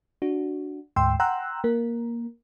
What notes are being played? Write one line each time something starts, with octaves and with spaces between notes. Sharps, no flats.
D4 F#4
D2 G#2 G5 C6 E6
F#5 G5 A#5 C6 E6 F#6
A#3 A#4